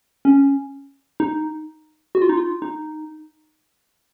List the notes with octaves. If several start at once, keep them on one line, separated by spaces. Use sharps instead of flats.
C#4
D#4
F#4
F4
D#4
F4
D#4